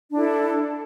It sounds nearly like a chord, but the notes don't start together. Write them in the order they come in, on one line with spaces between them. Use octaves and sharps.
D4 E4 A4